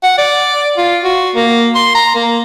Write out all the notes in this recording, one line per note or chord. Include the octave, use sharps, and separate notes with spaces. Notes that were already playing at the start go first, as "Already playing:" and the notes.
F#5
D5
F4
F#4
A#3
C6
A#5
A#3